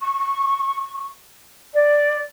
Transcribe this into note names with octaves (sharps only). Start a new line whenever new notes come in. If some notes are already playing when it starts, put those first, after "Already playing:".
C#6
D5